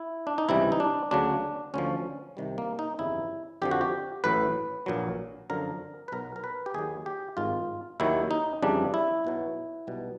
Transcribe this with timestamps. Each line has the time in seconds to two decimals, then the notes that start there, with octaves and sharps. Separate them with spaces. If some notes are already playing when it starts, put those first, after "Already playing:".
Already playing: E4
0.27 D4
0.38 D#4
0.49 C#2 C3 E3 G3 E4
0.72 D#4
0.80 D4
1.11 D2 C#3 F#3 D4
1.74 D2 D3 F3 C#4
2.37 C2 C3 D#3 G3
2.58 A#3
2.79 D#4
2.99 G1 F2 C#3 E3 G3 E4
3.62 F2 D3 F3 G4
3.71 F#4
3.81 G4
4.24 A1 A2 F#3 B4
4.86 A#1 A#2 F#3
5.50 F#2 D3 F3 A#4
6.08 B4
6.12 B1 B2 F#3 A#4
6.36 A#4
6.44 B4
6.66 G4
6.74 D#2 D#3 F#3 G#4
7.06 G4
7.37 G#1 G#2 D#3 F4
8.00 D#2 D#3 F#3 E4
8.31 D#4
8.62 F2 C#3 E3 G3 D4
8.94 E4
9.25 B1 B2 F#3
9.87 B1 B2 G3